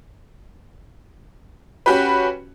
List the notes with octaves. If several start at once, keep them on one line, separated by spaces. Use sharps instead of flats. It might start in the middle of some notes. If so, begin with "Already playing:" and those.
C#4 F#4 G4 B4